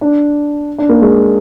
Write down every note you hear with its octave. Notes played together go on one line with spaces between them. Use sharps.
D4
D4
A#3
G#3